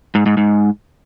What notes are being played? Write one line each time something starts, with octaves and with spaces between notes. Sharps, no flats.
G#2
G#2
G#2